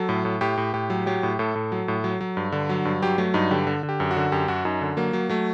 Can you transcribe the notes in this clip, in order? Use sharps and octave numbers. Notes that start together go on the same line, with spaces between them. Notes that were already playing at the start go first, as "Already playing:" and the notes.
Already playing: F#3 A4
A2
A2
A2 G4
A2
A2 G4
F#3
F#3 G4
A2
A2 A4
A2
F#3
A2
F#3
F#3
G2
D3
F#3
G2
F#3 G4
F#3 A3
G2 D#4
D3 G4
D3
D3
G4
F#2
F#4
D3
F#2 G4
F#2 F#4
F#2 D#4
D3
F#3 A#3
F#3
F#3 A3